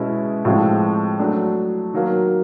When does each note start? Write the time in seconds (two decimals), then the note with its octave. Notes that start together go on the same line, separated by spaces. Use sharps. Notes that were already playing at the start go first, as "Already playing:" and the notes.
Already playing: B2 G#3 C#4 E4
0.45 A2 F3 G#3 C4
1.19 F#3 A3 D4
1.94 D#3 F#3 A#3